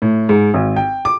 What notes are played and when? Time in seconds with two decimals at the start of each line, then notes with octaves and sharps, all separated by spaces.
0.02 A2
0.29 G#2
0.54 G#1
0.76 G5
1.05 D6